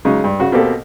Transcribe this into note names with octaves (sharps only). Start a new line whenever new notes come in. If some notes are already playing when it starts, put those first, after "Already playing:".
C#3 F#3 G#3 D#4
G2
C#3 F#4
B2 A#3 C4 G4 A4